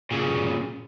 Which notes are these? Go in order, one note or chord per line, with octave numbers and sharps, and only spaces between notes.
A#2 C#3